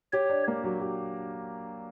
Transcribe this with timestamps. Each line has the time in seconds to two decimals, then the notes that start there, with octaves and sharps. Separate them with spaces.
0.13 G4 C#5
0.30 D4
0.48 A#3
0.64 F#3
0.81 G4